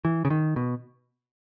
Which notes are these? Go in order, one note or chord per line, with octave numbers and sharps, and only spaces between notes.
E3
C#3
D#3
B2